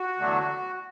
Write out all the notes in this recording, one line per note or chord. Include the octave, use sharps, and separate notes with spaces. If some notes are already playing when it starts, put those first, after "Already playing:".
Already playing: F#4
E2 D3 F#3 A3 D4